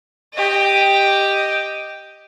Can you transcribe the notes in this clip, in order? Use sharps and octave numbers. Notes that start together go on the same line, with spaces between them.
G4 D#5